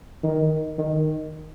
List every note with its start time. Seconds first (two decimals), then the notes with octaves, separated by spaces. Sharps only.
0.23 D#3
0.78 D#3